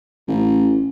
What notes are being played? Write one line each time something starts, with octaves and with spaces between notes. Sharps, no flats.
A1